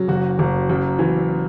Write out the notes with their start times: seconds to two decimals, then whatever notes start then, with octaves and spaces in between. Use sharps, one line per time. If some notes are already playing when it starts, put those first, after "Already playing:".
Already playing: C#3 F#3
0.08 F#1 F#4
0.39 F#1
0.70 F#2
0.99 E3